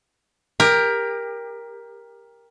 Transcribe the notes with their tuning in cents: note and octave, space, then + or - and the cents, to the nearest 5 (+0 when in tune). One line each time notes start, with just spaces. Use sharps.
G4 +25 A#4 +10